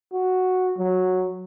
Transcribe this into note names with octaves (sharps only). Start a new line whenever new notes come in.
F#4
F#3